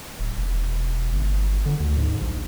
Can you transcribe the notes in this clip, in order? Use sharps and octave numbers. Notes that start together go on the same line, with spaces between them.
D1
E1
G1
D3
D2
G#2
A#1